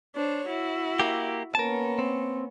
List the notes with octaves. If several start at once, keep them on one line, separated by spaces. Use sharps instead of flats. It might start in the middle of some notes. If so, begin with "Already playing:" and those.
D4 C5 C#5
E4 F#4
A#3 G4
A#3 B3 C#4 A#4 A5
C4